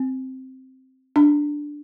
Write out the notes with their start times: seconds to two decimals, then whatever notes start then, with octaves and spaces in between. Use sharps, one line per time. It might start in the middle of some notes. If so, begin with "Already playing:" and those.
Already playing: C4
1.16 D4